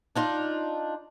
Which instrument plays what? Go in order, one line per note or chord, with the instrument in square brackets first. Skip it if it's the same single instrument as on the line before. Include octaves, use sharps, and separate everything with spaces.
[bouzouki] D4 D#4 F4